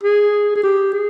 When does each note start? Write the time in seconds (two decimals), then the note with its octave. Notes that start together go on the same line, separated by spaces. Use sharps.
0.04 G#4
0.56 G#4
0.63 G4
0.93 G#4